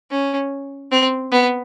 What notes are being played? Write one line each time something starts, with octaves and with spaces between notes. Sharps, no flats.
C#4
C4
B3